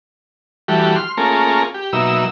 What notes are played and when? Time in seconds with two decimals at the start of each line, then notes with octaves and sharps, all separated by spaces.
0.68 E3 G3 A3 F#4 G4
0.96 C6 F6
1.17 A3 A#3 C#4 F4 G#4 A#4
1.74 G4
1.93 B2 F#3 A#3 D#4 E5 E6